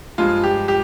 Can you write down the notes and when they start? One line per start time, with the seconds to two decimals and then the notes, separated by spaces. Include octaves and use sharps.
0.18 G2 F3 G#3 F4
0.44 G4
0.68 G4